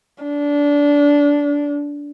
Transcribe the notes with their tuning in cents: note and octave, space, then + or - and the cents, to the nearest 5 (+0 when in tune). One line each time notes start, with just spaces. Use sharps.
D4 -20